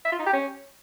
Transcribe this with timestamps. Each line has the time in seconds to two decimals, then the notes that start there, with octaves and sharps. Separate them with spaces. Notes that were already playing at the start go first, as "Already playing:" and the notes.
0.05 E5
0.12 F4
0.19 D#4
0.26 G4
0.33 C#4